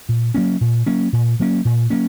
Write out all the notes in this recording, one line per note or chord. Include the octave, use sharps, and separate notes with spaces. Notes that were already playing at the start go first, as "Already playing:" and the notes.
A#2
F#3 A#3 C#4
A#2
F#3 A#3 C#4
A#2
F#3 A#3 C#4
A#2
F#3 A#3 C#4